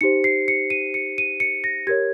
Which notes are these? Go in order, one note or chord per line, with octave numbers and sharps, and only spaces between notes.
D#4 G4 C5 C#7
C7
C#7
D#7
C#7
D#7
C#7
A#6
G4 A#4 C#5 G#6